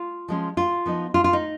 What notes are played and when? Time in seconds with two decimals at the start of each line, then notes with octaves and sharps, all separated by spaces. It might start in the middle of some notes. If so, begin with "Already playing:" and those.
Already playing: F4
0.28 F3 G#3 C#4
0.57 F4
0.86 F3 B3 D#4
1.14 F4
1.24 F4
1.33 D#4